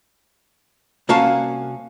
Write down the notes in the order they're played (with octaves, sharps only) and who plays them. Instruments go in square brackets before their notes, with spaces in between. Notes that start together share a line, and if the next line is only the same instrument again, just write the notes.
[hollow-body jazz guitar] C2 A#3 C#4 F#4 F5 A5